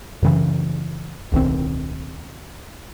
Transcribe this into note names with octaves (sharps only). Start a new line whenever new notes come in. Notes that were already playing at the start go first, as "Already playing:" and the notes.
F#2 C#3 E3
D1 B1 D#3 C4